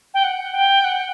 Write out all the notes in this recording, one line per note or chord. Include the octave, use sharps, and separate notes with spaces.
G5
F#5
G5
F#5